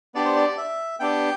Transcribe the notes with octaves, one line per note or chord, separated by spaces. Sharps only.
B3 D4 G4 D5
C5
D5
E5
B3 D4 G4 G5